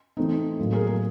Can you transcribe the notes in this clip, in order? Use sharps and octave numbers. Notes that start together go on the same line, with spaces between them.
E3 A3 C4 D#4
A2 F#3 A#3
G#4 A#4
G#4 A#4